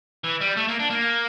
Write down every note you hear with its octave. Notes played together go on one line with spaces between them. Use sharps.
E3
G3
A3
A#3
D4
A#3